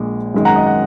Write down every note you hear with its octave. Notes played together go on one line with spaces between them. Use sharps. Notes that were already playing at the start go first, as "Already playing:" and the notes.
Already playing: A#1 A#2 G#3
G#1 F#2 D#3 G#3
F#5 A#5
D#5
F#5